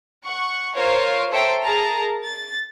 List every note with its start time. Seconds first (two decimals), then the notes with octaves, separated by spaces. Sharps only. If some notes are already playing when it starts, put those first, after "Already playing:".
0.25 F#5 C#6
0.75 F4 A#4 C5 C#5 F5
1.31 A4 C5 C#5 E5 G5 A#5
1.63 G#4 A#4 A5 A#5
2.23 A6